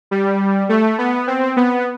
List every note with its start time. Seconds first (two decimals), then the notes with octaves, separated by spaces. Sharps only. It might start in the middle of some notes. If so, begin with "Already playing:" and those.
0.11 G3
0.69 A3
0.98 B3
1.27 C4
1.57 B3